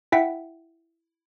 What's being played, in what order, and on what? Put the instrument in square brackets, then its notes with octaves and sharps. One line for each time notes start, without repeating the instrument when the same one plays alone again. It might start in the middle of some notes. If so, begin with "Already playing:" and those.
[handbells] E4 E5 F#5 G5 B6